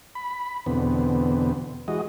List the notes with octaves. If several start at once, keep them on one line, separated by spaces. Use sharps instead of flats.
B5
E2 B2 D3 B3 C4
E3 G#3 F#4 D#5